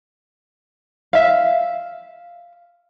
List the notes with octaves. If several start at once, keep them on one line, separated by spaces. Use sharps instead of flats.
E5 F5